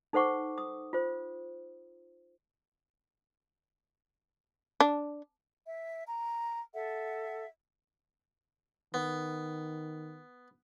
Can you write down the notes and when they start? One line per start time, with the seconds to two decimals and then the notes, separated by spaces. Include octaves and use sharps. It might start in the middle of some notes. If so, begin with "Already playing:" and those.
0.13 D#4 A4 C5 F#5 C#6 D6
0.58 D#6
0.93 F4 C5
4.80 D4
5.66 E5
6.08 A#5
6.74 A4 E5 F#5
8.94 D#3 B3